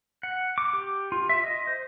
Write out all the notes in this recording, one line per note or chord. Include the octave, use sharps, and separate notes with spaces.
F#5
D6
G4
F4
E5
D#5
C5